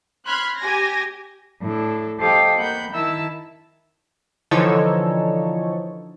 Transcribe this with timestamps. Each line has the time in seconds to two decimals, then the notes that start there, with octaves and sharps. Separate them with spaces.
0.24 B5 C6 F6 F#6 G#6
0.59 G4 G#5 G#6 A#6
1.61 A2 D4 A4
2.20 G4 A4 C5 D#5 F5 G5
2.58 A#3 F#5 B5 G6
2.93 D#3 E4 E5 A5 E6
4.51 D3 E3 F3 D#4 A4 C#5